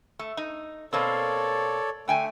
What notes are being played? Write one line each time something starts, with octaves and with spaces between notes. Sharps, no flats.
A3
D#4
B2 A#3 C4 A4 C#5 D5
D3 A3 G5 G#5